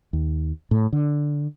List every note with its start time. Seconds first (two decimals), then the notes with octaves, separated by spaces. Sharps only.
0.13 D#2
0.71 A2
0.93 D3